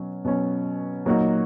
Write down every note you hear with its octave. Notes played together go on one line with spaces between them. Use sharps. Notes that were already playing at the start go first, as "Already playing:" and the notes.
Already playing: B2 F#3 C#4
B2 F#3 C#4
A#2 F#3 A#3 D#4 F#4